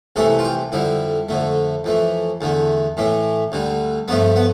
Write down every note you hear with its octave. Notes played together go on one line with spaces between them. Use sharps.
C2 C3 E3 A3 A4
F4
G4
F2 D3 G3 E4
F2 D3 A3
F2 E3 A3
E2 D3 A3
A2 E3 A3
D2 D3 G3
G2 F3 A3 B3
B3